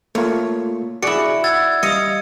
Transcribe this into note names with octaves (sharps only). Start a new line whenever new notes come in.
A3 A#3 F4 C#5
E4 F#4 G#4 D5 F#5 C#7
F#5 E6 G#6 A6
G3 D#5 F5 D#6 C#7